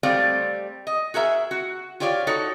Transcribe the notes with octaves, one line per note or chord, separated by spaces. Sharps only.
G3 A3 C4 G4 D5 F5
D#5
F#4 G#4 A#4 E5
F#4
F4 G4 C#5 D5 E5 F5
D#4 F#4 A4 C#5